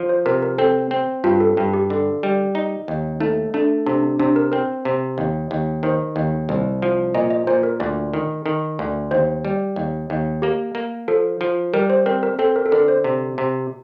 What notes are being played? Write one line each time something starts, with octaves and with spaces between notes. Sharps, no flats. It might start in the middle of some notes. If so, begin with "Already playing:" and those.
Already playing: F3
C5
C3 A#4
A#4
C4 A4
C4
G2 F4
A4
G2
G4
D3
G3
D#4
D#2
A3 D#4
A3 D4
C3 D4
D4
C3 D4
A#4
C4 A#4
C3
D#2
D#2
D#3 C5
D#2
C2
F3
A#2 D#5
D#5
A#2 C5
A#4
D2 D5
D#3
D#3
D2
D#2 C5
G3
D#2
D#2
A#3 G4
A#3
F3 A4
F3
G3 A#4
C5
C4 A#4
A#4
C4 A4
A#4
A4
D3 A#4
C5
C3
C3